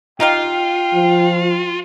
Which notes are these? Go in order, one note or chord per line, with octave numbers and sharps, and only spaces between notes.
D#4 F4 G4 F5 G5
F3